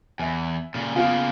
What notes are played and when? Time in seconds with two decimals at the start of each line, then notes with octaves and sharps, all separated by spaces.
0.19 E2 E5 G#5
0.75 A#2 C#3
0.96 C#3 A#3 B3 F4